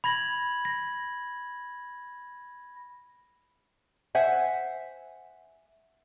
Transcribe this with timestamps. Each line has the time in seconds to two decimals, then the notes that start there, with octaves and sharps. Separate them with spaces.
0.04 B5 G#6 A#6 F#7
0.65 A#6
4.15 C5 E5 F#5 G#5